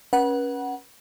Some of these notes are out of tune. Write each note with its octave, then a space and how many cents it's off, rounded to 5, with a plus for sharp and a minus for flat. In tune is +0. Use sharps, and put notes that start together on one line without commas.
C#4 +0 B4 -35 F#5 +10